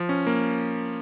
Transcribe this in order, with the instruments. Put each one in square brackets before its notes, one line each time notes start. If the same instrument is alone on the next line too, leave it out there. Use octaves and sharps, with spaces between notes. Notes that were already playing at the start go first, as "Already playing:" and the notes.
Already playing: [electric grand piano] F3
C#4
A#3